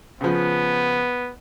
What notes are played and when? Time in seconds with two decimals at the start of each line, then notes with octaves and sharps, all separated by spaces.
0.21 C#3 F3 B3